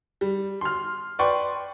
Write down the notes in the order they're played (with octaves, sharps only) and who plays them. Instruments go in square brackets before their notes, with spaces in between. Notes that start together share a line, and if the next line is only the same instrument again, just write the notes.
[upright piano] G3
C6 F6
B4 D5 G5 C6 C#6